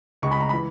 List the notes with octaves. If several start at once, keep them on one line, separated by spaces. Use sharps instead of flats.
C#2 C#3 G#3 C#6
B5
A#5
E3 B5